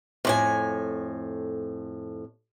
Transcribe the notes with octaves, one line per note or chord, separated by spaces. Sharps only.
F2 A2 G#5